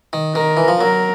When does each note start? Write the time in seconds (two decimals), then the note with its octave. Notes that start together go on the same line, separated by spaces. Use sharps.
0.13 D#3
0.35 D#3 A#4
0.57 E3
0.68 F3
0.79 F#3 A#4